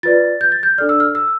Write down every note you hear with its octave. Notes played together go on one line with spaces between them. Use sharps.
F4 B4 D5 A6
G6
A6
G6
D4 A4 D5 F6
E6
F6
E6